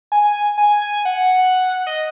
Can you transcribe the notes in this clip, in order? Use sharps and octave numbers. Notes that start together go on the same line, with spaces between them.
G#5
G#5
G#5
F#5
D#5